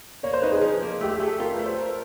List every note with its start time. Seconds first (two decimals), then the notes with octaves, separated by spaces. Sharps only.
0.23 A#3 C#5
0.33 C5
0.42 D#4 B4
0.52 G#4
0.61 F3
0.82 A#3
1.01 A3 G4
1.15 A3 G#4
1.27 A4
1.40 F4 A#4
1.53 B4
1.59 A3
1.66 C5
1.79 A#4